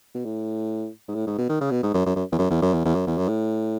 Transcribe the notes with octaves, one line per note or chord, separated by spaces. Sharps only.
B2
A2
G#2
A2
G#2
B2
D#3
C#3
B2
G#2
F#2
F#2
F#2
E2
F#2
E2
F#2
E2
E2
F#2
E2
F#2
A2